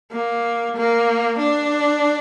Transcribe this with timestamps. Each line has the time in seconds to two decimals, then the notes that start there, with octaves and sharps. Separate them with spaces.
0.12 A#3
0.76 A#3
1.39 D4